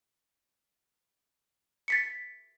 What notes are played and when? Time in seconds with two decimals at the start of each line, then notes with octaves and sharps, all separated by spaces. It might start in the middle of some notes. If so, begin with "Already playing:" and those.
1.88 A6 B6 C#7